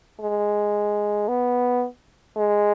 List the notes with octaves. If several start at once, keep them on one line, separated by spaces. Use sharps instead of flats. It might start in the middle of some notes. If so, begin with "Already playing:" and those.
G#3
B3
G#3